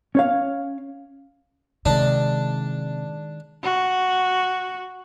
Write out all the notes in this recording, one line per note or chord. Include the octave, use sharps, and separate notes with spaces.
C#4 C#5 F5
C3 D#3 G#3 D4
F#4